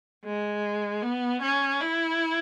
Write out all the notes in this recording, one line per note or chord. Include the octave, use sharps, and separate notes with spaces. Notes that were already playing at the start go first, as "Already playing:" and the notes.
G#3
B3
C#4
E4